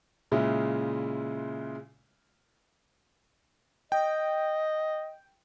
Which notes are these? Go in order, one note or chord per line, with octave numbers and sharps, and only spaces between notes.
A#2 C#3 G#3 E4 F4
D#5 G5